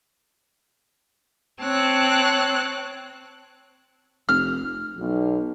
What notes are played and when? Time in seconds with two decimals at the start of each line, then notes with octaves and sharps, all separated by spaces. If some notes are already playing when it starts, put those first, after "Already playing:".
1.62 C4 C#5 A5 F#6
4.29 F1 F6
4.98 B1